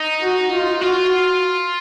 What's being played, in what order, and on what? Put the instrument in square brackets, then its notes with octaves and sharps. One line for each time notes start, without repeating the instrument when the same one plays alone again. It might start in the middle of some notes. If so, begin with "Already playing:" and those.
Already playing: [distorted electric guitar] D#4
[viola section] F#4
F4
[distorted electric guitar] F4 [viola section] F#4